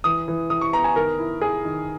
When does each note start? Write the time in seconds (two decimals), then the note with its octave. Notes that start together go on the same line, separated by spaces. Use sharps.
0.04 E3 D#6
0.28 E3
0.50 E3 D#6
0.61 C#6
0.73 B3 A#5
0.84 G#5
0.96 D#3 A#4
1.19 E4
1.41 E4 G#4
1.65 D#3